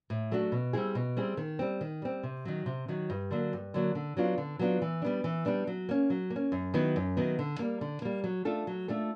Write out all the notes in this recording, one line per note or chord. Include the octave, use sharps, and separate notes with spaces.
A2
F#3 A3 D4 F#4
B2
G3 C4 E4 G#4
B2
G3 C4 E4 G#4
D#3
G3 C4
D#3
G3 C4
C3
D#3 F#3
C3
D#3 F#3
G2
D3 F#3 A#3
G2
D3 F#3 A#3
D3
F#3 B3 D4 F4
D3
F#3 B3 D4 F4
E3
G3 B3 D4
E3
G3 B3 D4
F#3
A#3 C#4
F#3
A#3
C#4
F#2
D#3 F#3 B3 E4
F#2
D#3 F#3 B3 E4
D3
G3 A#3
D3
G3 A#3
F#3
A3 D4 F4 A4
F#3
A3 D4 F4 A4